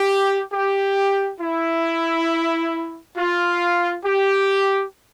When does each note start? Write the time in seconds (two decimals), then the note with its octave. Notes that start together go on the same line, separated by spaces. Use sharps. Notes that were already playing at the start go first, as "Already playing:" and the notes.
Already playing: G4
0.53 G4
1.41 E4
3.17 F4
4.05 G4